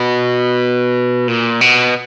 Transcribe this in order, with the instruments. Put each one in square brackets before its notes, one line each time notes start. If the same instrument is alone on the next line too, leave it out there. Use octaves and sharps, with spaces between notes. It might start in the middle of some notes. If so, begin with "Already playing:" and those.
Already playing: [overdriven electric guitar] B2
A#2
B2